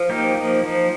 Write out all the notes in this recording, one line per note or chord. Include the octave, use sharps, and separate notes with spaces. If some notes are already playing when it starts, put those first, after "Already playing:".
Already playing: F3
A#3 D#4 G4
F3
F3